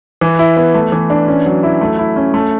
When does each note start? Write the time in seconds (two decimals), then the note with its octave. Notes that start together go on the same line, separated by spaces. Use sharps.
0.21 E3
0.39 E4
0.57 B3
0.75 A3
0.92 E3
1.10 D4
1.28 C#4
1.46 F#3
1.63 E4
1.81 A3
1.99 E4
2.16 C#4
2.34 A3